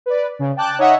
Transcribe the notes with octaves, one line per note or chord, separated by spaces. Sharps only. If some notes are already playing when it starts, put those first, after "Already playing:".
B4 D5
C#3
G5 A5 D6 F#6
D#4 C#5 D#5 E5 F#5